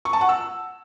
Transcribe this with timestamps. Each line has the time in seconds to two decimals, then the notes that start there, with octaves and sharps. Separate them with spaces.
0.05 C#6
0.13 A5
0.21 F#5
0.29 E6